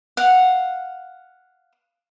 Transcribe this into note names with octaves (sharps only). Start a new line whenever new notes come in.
F5 F#5